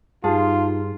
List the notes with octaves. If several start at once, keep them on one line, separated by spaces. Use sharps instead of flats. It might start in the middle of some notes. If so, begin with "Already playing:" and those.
G2 D#4 F4 G#4 A5